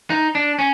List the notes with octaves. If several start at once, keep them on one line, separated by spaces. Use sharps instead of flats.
D#4
D4
C#4